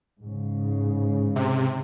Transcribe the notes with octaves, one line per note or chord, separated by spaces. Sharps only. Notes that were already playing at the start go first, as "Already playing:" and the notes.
G#2 C#3
C3